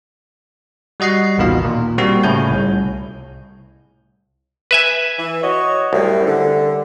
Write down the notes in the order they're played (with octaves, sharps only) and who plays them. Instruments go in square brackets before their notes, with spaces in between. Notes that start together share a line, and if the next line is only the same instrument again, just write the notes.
[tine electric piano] G3 F#4 D#5 F#5 C7
A1 D#2 B2 D#3 F4 F5
A#2
G3 A#3 C4 F#4
A2 C#3 E4 C#5 G#5 G6
C2
[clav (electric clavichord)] B4 E5 G#5
[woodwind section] E3
F#4 C#5 D#5
[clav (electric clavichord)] C2 [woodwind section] F#2 A2
[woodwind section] D3